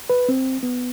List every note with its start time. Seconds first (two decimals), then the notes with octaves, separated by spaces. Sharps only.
0.10 B4
0.29 C4
0.63 B3